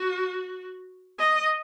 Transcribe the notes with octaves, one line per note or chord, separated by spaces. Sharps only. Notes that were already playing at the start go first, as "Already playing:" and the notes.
Already playing: F#4
D#5